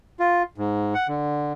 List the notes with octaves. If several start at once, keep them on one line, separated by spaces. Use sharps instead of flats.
F4
G#2
F#5
D3